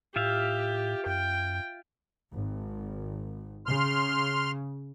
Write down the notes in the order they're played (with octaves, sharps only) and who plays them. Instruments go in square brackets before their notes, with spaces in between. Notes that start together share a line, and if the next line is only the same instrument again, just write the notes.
[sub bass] A2 [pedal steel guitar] F4 E5 F5 [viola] G4
[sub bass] F#2 [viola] G5
[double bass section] G#1
[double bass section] C#3 [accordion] C6 F6